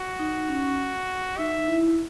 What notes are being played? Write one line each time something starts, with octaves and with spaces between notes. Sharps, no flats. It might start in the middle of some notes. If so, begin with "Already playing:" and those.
Already playing: F#4
D#4
C#4
D#4 E5
E4